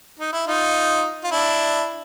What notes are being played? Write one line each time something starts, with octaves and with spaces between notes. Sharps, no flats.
D#4
E4
D#4 F4
F4
D4 E4